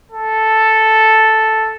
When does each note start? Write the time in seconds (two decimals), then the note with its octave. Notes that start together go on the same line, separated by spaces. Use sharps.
0.12 A4